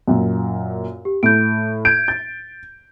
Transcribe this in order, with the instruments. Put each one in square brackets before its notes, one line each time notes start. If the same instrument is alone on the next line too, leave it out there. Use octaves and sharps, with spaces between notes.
[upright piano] F#2 A#2
[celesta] G4
[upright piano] A2 [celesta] G6 D7
[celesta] G6 G#6 [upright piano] D7
[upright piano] G6 [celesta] A6